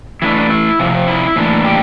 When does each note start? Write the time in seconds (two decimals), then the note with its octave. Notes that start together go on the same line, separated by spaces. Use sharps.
0.22 E3 A3 D4 E4
0.36 D4
0.50 E4
0.79 C3 F3 C4
1.08 E4
1.36 A2 E3 A#3 D4
1.64 G4